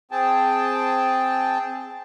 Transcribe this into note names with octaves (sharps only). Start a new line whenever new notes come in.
C4 G#4 G5 A5